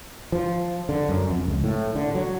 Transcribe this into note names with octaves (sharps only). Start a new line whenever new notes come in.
F3
D3
F#2
F2
C#2
A2
D3
F#3